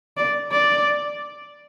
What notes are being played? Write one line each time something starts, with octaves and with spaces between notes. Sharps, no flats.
D5
D5